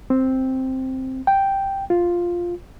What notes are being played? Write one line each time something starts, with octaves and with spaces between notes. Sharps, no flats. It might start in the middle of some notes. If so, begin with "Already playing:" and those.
C4
G5
F4